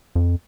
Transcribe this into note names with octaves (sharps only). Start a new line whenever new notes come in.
F2